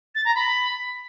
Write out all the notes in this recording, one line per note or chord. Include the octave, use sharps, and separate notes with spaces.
A6
A#5
B5